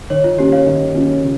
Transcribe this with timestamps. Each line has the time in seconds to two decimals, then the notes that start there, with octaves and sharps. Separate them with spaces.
0.10 D#3 C#5
0.24 F4
0.38 A#3 C#4 F4 G4
0.52 C#5 F5
0.66 D#3
0.94 A#3 C#4 F4
1.22 C#3